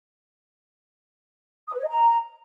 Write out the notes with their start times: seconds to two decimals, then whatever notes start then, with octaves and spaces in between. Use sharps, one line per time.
1.68 D#6
1.73 B4
1.78 C#5
1.83 D#5
1.88 A#5